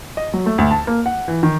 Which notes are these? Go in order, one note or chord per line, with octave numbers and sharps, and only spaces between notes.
D#5
F#3
A3
D2
A5
A#3
F#5
E3
D#3